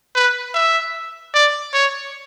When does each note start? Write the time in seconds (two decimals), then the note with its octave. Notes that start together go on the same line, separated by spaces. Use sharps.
0.16 B4
0.54 E5
1.35 D5
1.74 C#5